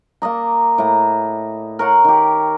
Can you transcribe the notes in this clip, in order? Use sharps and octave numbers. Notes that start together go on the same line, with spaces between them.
A#3 D5 D#5 A#5
A2 A#5
A#4 C#5 F#5
D#3 G4